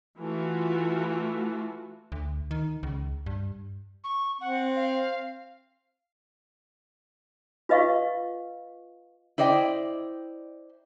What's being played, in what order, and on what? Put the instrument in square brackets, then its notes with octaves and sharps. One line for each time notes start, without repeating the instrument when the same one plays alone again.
[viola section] E3 A3 F4 F#4
[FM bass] D2
D#3
C#2
G2
[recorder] C#6
[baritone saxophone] C4 [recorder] F#5
[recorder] F5
[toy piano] F4 B4 D#5 F5 C#6
[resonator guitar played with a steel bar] E4 C5 D5 D#5 G5